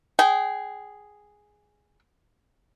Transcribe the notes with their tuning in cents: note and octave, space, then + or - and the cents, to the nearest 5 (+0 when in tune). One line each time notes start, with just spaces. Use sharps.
G#4 +0 G5 -30